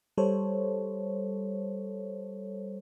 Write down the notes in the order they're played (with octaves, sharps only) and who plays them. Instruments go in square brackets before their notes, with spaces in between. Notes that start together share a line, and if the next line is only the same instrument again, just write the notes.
[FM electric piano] G3 A4 C5 C#5